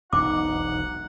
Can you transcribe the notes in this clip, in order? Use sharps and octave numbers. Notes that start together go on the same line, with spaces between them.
E1 B1 F2 D#4 F#5 D6